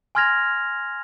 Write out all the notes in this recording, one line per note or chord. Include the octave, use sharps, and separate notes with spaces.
G#5 C6 F6 G#6 A#6 F7